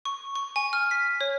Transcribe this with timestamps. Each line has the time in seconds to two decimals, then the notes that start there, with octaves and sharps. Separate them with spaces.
0.05 C#6
0.35 C#6
0.56 G#5
0.73 F6
0.91 B6
1.21 C#5